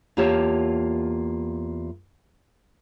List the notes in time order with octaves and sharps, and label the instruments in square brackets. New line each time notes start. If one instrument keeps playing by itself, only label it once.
[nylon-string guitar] E2 A#3 F4 G4 C#5 A5